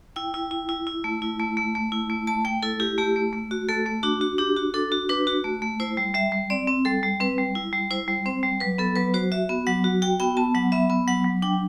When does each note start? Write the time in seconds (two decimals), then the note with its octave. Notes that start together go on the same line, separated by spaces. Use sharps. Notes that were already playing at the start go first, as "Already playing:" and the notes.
0.16 E4 G5
0.34 E4
0.51 E4
0.69 E4
0.87 E4
1.04 A3
1.22 E4
1.39 A3
1.57 A3
1.75 A3
1.92 E4
2.10 A3
2.27 A3 A5
2.45 A3 G5
2.63 E4 A4
2.80 E4 G4
2.98 A3 G4
3.16 A3
3.33 A3
3.51 F#4
3.69 A3 A4
3.86 A3
4.03 D4 F#4
4.21 F#4
4.38 D4 G4
4.56 F#4
4.74 D4 A4
4.92 F#4
5.09 D4 B4
5.27 F#4
5.44 A3
5.62 A3
5.80 E4 C5
5.97 G3
6.14 G3 E5
6.32 G3
6.50 C4 D5
6.67 C4
6.85 G3 A4
7.03 G3
7.20 C4 B4
7.38 G3
7.55 E4
7.73 G3
7.91 E4 C5
8.08 G3
8.26 C4 C5
8.43 G3
8.60 F#3 B4
8.78 B3 A4
8.96 F#3 B4
9.14 F#4 C5
9.32 F#4 E5
9.49 B3
9.67 F#3 F#5
9.84 F#4
10.02 F#4 G5
10.20 B3 G5
10.37 B3 A5
10.54 F#3 F#5
10.72 B3 E5
10.90 B3
11.08 F#3 F#5
11.24 F#3
11.42 D4 G5